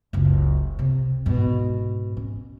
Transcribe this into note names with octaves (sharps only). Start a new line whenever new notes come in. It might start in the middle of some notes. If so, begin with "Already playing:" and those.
F#1 C#2
C3
G#2 B2
C#4